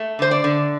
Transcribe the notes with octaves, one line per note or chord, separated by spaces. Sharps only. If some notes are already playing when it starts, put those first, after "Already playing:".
Already playing: A3
D3 C5
D5
D3